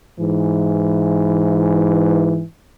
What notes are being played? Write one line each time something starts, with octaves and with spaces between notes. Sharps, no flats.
G#2 E3